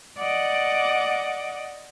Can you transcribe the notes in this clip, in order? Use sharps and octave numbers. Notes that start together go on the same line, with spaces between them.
D5 D#5 F#5 D6